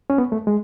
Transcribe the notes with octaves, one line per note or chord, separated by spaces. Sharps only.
C#4
B3
A3
G#3